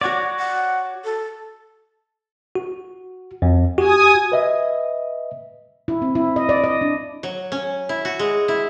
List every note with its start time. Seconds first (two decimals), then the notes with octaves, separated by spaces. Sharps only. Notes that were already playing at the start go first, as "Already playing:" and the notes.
0.01 F#4 C#5 D5 F#5
0.38 F#5
1.04 A4
2.55 F#4
3.42 F2
3.78 F#4 G4 G#5 D#6
4.32 B4 D#5 E5
5.88 E4
6.02 C4
6.15 E4
6.36 D#5
6.49 D5
6.64 D#5
6.81 D4
7.23 F#3
7.52 C#4
7.89 E4
8.05 F#4
8.19 G#3
8.48 E4